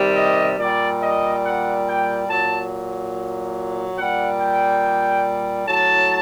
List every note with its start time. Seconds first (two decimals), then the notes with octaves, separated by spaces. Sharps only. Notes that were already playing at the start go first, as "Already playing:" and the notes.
Already playing: C3 D#3 G3
0.16 D#5
0.59 A#2 G3 D5
1.01 D#5
1.43 F#5
1.86 G5
2.28 A#2 F#3 A5
3.97 A#2 G3 F#5
4.39 G5
5.67 A2 F#3 A5